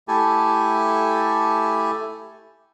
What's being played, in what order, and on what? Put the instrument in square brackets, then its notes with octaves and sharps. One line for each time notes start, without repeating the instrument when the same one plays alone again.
[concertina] A3 E4 G4 A4 G#5 A5